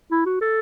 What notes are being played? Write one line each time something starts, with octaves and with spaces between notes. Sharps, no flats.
E4
F#4
A4